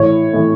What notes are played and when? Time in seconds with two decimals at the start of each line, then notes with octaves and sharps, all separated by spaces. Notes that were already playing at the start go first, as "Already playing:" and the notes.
Already playing: A2 E3 C#5
0.33 A2 E3